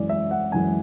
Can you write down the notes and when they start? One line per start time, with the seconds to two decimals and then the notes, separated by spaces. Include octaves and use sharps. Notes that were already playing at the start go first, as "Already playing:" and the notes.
Already playing: F#2 E3 G#3 D5
0.09 E5
0.31 F#5
0.52 F#2 E3 G#3 G#5